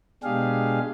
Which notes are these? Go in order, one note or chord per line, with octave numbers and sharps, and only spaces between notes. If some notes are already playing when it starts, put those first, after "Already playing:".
B2 G#3 D4 G4 G#4 F5